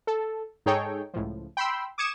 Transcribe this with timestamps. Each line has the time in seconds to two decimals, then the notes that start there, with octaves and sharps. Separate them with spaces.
0.07 A4
0.66 G#2 D#4 G#4 A4 C#5 G5
1.14 C#2 A2 F3
1.57 G5 B5 C6 E6
1.98 D6 D#6 G#6 C#7 E7